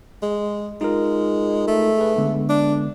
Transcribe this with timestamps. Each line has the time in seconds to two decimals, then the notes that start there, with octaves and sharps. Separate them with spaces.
0.22 G#3
0.81 G#3 D#4 F4 A#4
1.67 A3
1.99 G#4 B4
2.16 D3 G#3 B3
2.49 D4